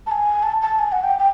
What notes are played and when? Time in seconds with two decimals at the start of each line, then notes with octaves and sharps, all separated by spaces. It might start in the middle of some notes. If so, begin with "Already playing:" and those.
0.07 A5
0.11 G#5
0.43 A5
0.62 A5
0.79 G#5
0.92 F#5
1.03 G5
1.19 G5